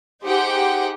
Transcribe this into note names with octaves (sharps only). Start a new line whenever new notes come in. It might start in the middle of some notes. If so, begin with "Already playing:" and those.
D#4 G4 G#4 C5 F#5 G5